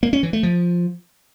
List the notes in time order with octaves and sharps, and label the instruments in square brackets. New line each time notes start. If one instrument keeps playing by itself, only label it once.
[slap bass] A#3
C#4
E3
A3
F3